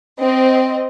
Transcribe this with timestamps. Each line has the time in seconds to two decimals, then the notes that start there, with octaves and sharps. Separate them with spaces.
0.19 C4 D#5